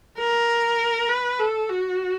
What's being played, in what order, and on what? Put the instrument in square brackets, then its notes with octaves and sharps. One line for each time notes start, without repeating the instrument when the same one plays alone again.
[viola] A#4
B4
A4
F#4